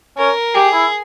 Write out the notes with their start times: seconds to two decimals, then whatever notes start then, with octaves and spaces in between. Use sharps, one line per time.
0.18 C#4 A#4
0.55 G4 G#4
0.73 E4